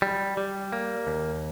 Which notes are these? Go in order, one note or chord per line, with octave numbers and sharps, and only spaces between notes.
G3
G3
A#3
D#2